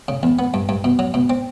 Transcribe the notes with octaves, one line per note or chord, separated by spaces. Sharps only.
C#3
E2
B3
G2
G2
B2
F#3
B2
C4